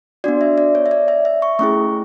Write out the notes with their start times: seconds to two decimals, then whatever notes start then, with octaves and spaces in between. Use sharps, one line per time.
0.24 B3 D4 F#4 D5
0.41 E5
0.58 D5
0.75 C#5
0.86 E5
0.91 D5
1.08 E5
1.25 E5
1.42 C#6
1.59 A3 C#4 E4 G#4 C#6